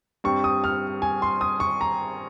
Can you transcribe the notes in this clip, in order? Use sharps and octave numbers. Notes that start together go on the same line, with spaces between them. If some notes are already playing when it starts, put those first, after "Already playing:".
G2 G3 C4 C#6
D#6
F6
G#5
C6
D#6
C#6
A#5